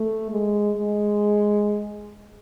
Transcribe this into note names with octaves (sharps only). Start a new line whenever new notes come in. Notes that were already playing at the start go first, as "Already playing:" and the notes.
Already playing: A3
G#3
G#3